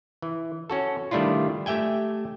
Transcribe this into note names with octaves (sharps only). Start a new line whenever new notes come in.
E3
C#4 F#4 A4
D#3 G3 A3 D4 E4 F4
A3 G4 E5 G5 G#5